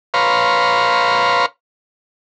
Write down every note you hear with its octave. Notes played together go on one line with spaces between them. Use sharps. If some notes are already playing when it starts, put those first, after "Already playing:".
B4 C#5 F5 A#5 C6